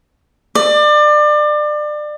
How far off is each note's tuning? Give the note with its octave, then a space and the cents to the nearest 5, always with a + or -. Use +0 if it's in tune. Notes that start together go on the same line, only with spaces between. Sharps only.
D5 +30